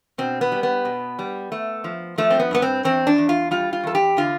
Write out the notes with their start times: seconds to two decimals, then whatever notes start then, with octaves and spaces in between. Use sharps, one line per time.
0.18 B2 C4
0.41 B3
0.52 G3
0.63 B3
0.85 B2
1.19 G3
1.52 A3
1.84 F3
2.18 F3 A3
2.30 C4
2.40 B3
2.51 G2 B3
2.62 C4
2.84 E2 C4
3.07 D4
3.18 E2
3.29 F4
3.51 G3 F4
3.73 F4
3.84 E2 A4
3.95 G4
4.17 D3 F4